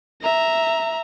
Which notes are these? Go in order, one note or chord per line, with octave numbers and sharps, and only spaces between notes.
E5 A#5